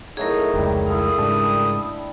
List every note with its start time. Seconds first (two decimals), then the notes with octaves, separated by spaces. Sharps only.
0.17 F#3 A3 D#4 E4 G#4 A#4
0.54 F1 C#2 D#3 G3
0.87 E4 A4 F5 D#6
1.18 G#2 C#3 G3 D4 A5